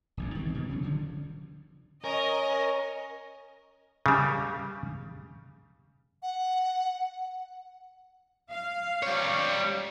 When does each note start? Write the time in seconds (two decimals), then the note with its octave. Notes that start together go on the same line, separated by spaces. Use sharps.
0.17 E1 A#1 F2
0.35 D#3 G3 C4
0.54 B2
0.69 D#1 C#3 F#3
0.83 D3 F3
2.04 C#4 A#4 C#5 D#5
4.06 C#3 G3
6.23 F#5
8.49 F5
9.03 G3 C#5